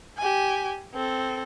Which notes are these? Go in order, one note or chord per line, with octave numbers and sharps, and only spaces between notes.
G4 G#5
C4 A4